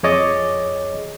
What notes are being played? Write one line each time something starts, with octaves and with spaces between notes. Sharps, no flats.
F2 G#4 C#5 D#5 D6 A6